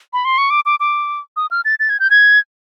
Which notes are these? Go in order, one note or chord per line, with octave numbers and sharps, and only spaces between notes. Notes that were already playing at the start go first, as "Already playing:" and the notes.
B5
C6
C#6
D6
D6
D6
D#6
F6
A6
A6
G#6
G6
G#6